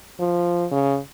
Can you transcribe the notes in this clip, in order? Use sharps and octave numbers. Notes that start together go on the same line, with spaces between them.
F3
C#3